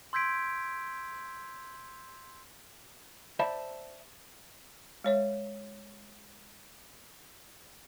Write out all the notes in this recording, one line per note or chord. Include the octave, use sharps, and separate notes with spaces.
C6 E6 G6 G#6 B6 D7
C5 D5 E5 A5 B5
G#3 C#5 E5